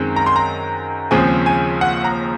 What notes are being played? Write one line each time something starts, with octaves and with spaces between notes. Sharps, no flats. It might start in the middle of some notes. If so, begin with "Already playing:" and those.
Already playing: F#2 D#3 G#3 C4
A#5
C6
A#5
D#2 C#3 F3 G#3 C4 G#5
G#5
F#5
A#5